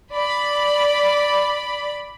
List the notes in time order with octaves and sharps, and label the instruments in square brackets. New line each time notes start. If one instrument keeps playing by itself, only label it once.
[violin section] D5 B5